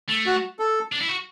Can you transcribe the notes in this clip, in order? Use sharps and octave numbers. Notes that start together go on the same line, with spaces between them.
A3
F#4
A4
D4
E4
F#4